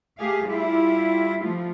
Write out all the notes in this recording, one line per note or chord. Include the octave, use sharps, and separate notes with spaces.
A3 G4 G#4 F5
G3 E4 F4 G4
F3 A3 F4